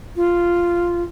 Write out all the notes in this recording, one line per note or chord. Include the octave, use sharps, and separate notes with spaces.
F4